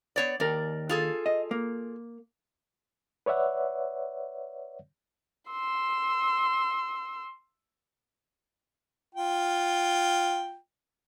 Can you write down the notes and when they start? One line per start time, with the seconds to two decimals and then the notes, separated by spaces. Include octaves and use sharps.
0.16 B3 C#5 D5
0.40 D#2 A#4 D5
0.89 F4 G#4 A4
1.26 D#5
1.51 A#3
3.26 B4 C#5 D5 E5 F#5
5.51 C6 E6
9.15 F4 G5